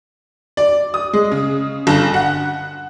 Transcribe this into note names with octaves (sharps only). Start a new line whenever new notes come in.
D5
D#6
G#3
C#3
G1
F#5